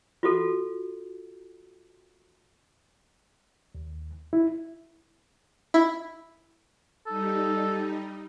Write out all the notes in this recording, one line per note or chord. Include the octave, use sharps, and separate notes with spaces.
F4 F#4 A4
D#2
E4
E4
G3 D#4 A4